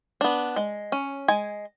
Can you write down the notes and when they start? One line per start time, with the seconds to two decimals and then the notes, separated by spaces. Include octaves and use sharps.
0.21 B3 D4
0.56 G#3
0.92 C#4
1.28 G#3 G#5